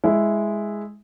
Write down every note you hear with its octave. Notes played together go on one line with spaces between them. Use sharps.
G#3 E4